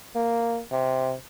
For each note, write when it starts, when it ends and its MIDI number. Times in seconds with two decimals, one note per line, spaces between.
0.15 0.60 58
0.72 1.14 48